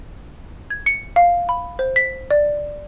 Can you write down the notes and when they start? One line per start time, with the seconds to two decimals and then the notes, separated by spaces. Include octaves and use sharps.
0.70 G#6
0.86 C#7
1.16 F5
1.49 B5
1.79 C5
1.96 B6
2.31 D5